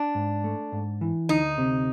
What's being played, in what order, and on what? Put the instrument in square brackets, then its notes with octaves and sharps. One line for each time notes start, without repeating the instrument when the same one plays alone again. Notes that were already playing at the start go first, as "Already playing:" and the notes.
Already playing: [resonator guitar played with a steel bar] D4
[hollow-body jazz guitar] G#2
A3
G#2
E3
[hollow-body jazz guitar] D2 [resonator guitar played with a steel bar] D#4
[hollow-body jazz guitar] C3